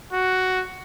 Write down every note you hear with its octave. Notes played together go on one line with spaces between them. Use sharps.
F#4